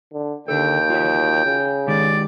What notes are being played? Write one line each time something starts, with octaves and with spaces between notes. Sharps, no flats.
D3
D#2 D3 A4 G5
F4 F#4 C#5
C#3
D#3 G#3 G4 D5